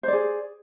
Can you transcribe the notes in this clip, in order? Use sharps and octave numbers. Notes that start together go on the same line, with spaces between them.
G#4 C5 D5